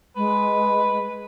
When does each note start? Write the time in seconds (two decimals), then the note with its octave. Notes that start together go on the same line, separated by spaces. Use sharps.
0.16 G#3 B4